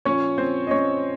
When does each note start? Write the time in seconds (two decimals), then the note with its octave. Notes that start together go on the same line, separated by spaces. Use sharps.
0.05 A#2 F3 C#4 C#5
0.38 C4 C5
0.67 D#5
0.71 C#4 C#5